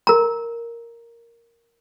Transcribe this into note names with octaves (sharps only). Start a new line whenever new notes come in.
A#4 A#5